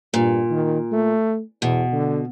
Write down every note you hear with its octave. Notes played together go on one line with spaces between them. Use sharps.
G2 A#2
D#3
A3
E2 B2
D3